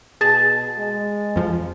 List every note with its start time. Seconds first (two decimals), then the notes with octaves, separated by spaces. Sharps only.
0.21 B2 G#4 A5 A6
0.78 G#3
1.36 F2 F3